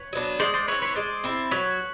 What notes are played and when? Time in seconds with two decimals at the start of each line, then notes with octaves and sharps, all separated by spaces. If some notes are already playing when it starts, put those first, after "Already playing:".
Already playing: B4 C#5
0.13 F#3 B3 D4
0.40 G#3 C5 D5
0.54 C5 D5
0.68 C4 E4 B4 C#5
0.82 B4 C#5
0.96 G#3 C5 D5
1.24 C4 E4
1.51 F#3 B4 C#5